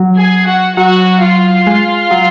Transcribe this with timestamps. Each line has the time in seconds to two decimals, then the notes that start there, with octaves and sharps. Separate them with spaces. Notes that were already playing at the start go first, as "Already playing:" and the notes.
Already playing: F#3
0.17 G#4 G#5
0.47 F#4 F#5
0.76 F#3 F#4 F#5
1.21 F4 F5
1.67 G#3
2.11 F#3